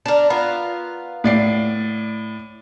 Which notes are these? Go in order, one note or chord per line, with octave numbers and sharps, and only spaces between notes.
D4 A#4
B3 F4 A#4
A2 D5 C7